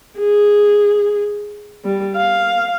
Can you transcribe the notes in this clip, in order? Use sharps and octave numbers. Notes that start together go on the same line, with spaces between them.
G#4
G3
F5